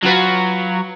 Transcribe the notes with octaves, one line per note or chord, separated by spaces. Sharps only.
F#3 F4 F#4 B4